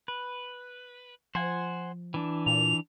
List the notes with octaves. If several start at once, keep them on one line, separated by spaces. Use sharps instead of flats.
B4
F3 C5 F#5 G#5
E3 D4
A#2 F7